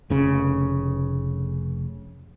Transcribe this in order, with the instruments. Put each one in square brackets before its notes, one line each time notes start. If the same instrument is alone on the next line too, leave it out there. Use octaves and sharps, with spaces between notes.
[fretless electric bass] F1 C#3